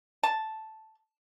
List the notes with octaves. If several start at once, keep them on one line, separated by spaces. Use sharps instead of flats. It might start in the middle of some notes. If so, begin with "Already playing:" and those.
A5